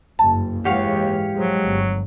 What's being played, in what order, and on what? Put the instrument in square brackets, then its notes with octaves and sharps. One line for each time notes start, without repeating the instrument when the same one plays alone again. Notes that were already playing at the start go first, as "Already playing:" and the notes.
[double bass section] F#1 G2 [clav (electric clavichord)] A5
[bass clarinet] D#2 [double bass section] G#2 E3 G#3 [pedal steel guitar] G4 C#5 F5 [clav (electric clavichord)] F#5
[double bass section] F3 G#3 [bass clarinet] F#3
[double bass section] G1